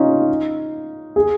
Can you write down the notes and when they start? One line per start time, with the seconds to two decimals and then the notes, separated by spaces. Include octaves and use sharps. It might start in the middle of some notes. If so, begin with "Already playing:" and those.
Already playing: C#4 D#4 F4
1.16 G#4